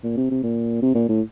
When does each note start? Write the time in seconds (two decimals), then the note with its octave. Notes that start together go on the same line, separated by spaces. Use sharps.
0.04 A#2
0.17 C3
0.31 C3
0.43 A#2
0.82 C3
0.95 A#2
1.09 A2